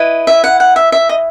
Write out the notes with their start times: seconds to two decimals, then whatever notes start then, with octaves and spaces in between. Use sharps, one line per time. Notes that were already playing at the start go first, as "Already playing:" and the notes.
Already playing: E4 B4 D#5
0.27 E5
0.44 F#5
0.60 F#5
0.76 E5
0.92 E5
1.09 D#5